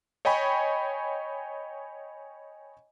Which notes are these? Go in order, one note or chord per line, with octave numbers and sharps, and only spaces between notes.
C#5 D#5 G5 G#5 B5 C#6